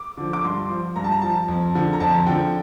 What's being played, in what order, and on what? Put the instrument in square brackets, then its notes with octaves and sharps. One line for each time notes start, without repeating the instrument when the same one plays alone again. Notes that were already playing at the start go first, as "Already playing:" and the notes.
Already playing: [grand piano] D6
D3 F3
D6
G2 C6
F3
G2 A#5
A5
A#5
F3 A5
F2
D3 F3
A#5
F2 A5
D3 F3 G5